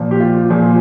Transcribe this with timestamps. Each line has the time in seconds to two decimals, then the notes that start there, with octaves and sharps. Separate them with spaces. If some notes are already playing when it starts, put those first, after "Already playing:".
Already playing: A#2 F3
0.11 G4
0.20 F4
0.50 A#2 F3 G#4